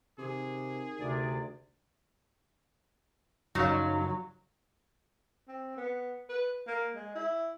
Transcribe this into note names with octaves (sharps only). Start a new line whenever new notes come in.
C3 D#3 G#4
D2 C3 D5
F#2 C#3 F3 F#3 D#4 F5 C#6
C4
B3
B4
A#3
G#3
E4